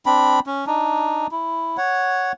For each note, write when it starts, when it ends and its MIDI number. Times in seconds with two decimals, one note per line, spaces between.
0.06 0.40 60
0.06 0.40 62
0.06 0.40 83
0.47 0.65 61
0.67 1.27 62
0.67 1.27 63
1.32 1.77 64
1.77 2.32 73
1.77 2.32 78